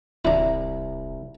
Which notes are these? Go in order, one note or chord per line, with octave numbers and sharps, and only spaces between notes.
D1 C2 D4 E4 A#5